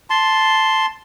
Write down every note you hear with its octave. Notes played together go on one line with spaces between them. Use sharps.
A5 C6